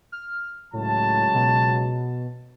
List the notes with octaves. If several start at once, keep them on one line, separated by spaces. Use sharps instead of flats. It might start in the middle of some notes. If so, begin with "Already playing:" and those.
F6
C#2 A2 F#3 A5
B2